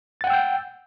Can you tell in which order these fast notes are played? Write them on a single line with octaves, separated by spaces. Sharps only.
A6 F#5 G5 E6 G6